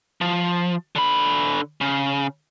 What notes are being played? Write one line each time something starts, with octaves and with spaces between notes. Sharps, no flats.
F3
D3 B5
C#3